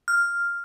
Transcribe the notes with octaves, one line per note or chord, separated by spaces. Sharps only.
F6